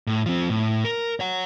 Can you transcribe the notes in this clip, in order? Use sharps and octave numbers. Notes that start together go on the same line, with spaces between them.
A2
F3 C4
A2
A#4
C#5 F#5